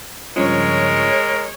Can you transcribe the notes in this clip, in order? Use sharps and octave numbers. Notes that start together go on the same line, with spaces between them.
G2 C#3 F3 G#3 A#4 C#5